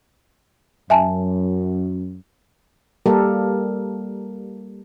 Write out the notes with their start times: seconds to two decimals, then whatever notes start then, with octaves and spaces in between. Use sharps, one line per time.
0.90 F#2 E5 G#5 A5
3.06 G3 A#3 G4 A4 A#4